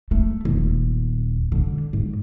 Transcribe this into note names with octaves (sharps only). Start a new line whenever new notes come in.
A3
D#1
D3
G#2